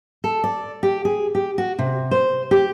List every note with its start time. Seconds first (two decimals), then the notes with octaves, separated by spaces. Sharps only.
0.24 A4
0.44 D5
0.83 G4
1.05 G#4
1.35 G4
1.58 F#4
1.79 C3
2.11 C5
2.51 G4